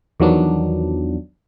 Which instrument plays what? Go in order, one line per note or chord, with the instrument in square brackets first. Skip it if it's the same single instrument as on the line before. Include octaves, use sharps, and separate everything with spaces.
[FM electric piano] E2 D#3 F3 F#3 B3 D4